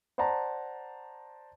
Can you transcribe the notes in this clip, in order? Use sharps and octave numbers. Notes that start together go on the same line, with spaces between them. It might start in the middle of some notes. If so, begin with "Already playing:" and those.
C5 D5 F#5 A5 A#5